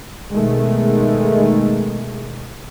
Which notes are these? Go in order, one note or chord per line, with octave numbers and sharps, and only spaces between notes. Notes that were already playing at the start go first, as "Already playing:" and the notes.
B2 D#3 G#3 A3